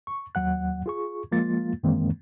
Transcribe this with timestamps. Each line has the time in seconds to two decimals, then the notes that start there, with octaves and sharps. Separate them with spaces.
0.07 C#6
0.35 D#2 F#3 F#5 F#6
0.86 F4 G#4 C#6
1.32 F3 G#3 A#3 F4 A6
1.83 F#2 D#3 E3 G#3 A#3 C4